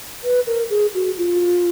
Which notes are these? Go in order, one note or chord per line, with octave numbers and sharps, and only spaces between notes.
B4
A#4
G#4
F#4
F4